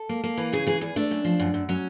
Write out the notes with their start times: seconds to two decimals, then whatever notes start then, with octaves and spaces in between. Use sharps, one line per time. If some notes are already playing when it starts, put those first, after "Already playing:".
Already playing: A4
0.09 A#3
0.24 A#3
0.37 E3
0.53 C#3 G#4
0.66 E3 G#4
0.81 E2 G#4
0.96 A3 D4
1.11 F#2
1.25 F3
1.39 F#2
1.54 F#2
1.69 F#3 C#4